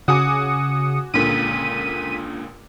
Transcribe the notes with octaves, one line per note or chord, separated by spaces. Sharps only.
C#3 F#4 G#5 D6 D#6 C#7
C#2 A#2 D3 B6 D#7